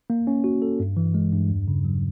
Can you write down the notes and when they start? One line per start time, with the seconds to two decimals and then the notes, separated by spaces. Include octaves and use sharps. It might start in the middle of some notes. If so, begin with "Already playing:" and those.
0.10 A#3
0.27 C#4
0.44 F#4
0.62 A4
0.80 G2
0.97 E3
1.14 G#3
1.32 G2
1.50 E2
1.68 C#3
1.85 F#3